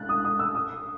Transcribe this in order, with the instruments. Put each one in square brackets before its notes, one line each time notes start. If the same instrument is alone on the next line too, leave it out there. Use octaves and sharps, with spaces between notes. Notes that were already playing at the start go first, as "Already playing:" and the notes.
Already playing: [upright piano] F#6 A6
D#6
D#6
E6
D#6